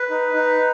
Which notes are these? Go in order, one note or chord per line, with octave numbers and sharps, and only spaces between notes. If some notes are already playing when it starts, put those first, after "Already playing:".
Already playing: B4
D#4
D#4